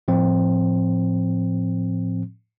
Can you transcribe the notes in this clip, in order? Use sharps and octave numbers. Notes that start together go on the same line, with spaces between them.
A2 F3 C4